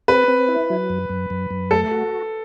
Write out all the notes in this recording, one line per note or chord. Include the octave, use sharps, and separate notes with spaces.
C4 B4
C4
E4
F#3
F#2
F#2
F#2
F#2
A3 A4
F#4